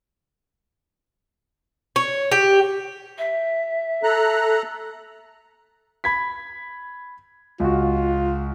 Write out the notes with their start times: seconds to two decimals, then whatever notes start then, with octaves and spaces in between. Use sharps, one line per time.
1.96 C#5
2.32 G4
3.18 E5
4.03 A4 A#5 F#6
6.04 B5 G#6 B6
7.60 C#2 F4 F#4